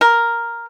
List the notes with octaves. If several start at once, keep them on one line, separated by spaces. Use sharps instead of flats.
A#4